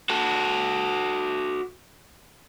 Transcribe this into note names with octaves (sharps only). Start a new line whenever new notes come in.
F#4 A4